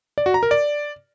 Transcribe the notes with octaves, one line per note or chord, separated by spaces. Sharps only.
D5
F#4
A#5
A#4
D5